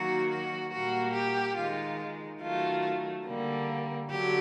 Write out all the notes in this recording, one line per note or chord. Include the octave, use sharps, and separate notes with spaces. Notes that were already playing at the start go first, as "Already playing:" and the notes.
Already playing: D#3 F#3 A#3 F#4
F#4
A#2 G3 A#3 F#4
G4
D#3 G#3 F4
D#3 F#3 A3 F4
D3 G3 A#3
D3 F#3 G4